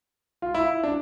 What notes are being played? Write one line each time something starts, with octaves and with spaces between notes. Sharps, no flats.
F4
E4
D4